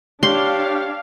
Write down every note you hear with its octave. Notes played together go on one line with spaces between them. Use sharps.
D4 G4 C#5 F5 C6